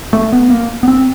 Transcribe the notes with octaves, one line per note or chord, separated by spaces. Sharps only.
A3
B3
A#3
B3
C4